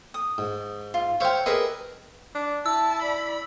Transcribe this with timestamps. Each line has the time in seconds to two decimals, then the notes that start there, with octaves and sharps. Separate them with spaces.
0.14 D#6
0.38 G#2
0.94 F4
1.20 C5 C#5 E5 F5 G5
1.46 G4 G#4 A#4 B4 D#5 E5
2.35 D4
2.66 E4 A5 E6
3.02 D5 B5